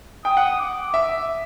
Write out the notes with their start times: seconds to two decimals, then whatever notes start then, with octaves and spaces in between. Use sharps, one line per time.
0.25 G5 D#6
0.37 F#5
0.59 D6
0.94 E5